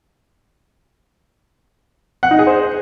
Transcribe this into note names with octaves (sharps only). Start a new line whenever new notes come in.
F#5
D#4
G#4
C5